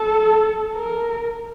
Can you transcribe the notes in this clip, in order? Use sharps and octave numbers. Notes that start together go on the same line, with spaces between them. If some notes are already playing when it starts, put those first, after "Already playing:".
Already playing: A4
A#4